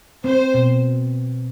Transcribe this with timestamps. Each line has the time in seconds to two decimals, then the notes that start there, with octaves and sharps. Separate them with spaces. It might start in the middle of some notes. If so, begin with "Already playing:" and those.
0.24 C4 C5
0.54 B2